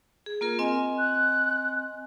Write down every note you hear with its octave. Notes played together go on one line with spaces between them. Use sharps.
G#4
A#3 F4 A#4
C4 D#5 G#5
F#6